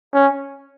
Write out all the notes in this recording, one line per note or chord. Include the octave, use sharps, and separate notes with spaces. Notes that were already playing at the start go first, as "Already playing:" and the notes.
C#4